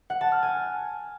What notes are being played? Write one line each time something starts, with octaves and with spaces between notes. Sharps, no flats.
F#5
A5
F6
G#5